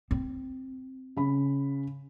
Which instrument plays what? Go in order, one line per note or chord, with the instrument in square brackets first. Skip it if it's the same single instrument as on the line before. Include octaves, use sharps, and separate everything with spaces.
[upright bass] C4
[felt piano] C#3 B5